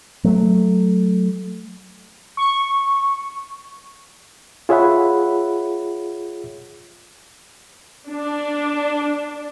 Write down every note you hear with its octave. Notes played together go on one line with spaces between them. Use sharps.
F#3 A3
C#6
F4 G#4 C#5 E5 F#5 B5
D4